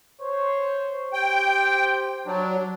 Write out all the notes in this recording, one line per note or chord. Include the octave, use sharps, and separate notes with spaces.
C5 C#5
G4 C5 G5
F#3 D4